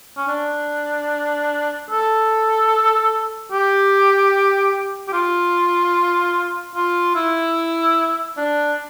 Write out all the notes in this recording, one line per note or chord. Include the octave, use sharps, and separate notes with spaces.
C#4
D4
A4
G4
G4
F4
F4
E4
D4